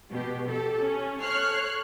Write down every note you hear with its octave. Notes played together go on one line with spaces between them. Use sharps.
B2 G4
G4 A4
C#4
A4 C#5 F6 F#6 C7